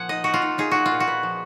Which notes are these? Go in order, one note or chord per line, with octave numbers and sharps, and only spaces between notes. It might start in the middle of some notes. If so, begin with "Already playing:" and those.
Already playing: A#2 F3 A#3 F#5 G#5
D#4 D#5
D#4 F#4
F4
D#4
D#4 G#4
D#4 F#4
F4
A#2
F#4
B3
F3